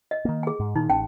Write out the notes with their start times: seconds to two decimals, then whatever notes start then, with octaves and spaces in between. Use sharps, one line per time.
0.11 D#5
0.25 D#3 A#3
0.43 G#4 G#5
0.60 G#2
0.76 A#2 D#3 D#4
0.90 A1 C#4 G5 A5